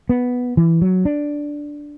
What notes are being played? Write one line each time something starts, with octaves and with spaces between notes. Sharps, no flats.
B3
E3
F#3
D4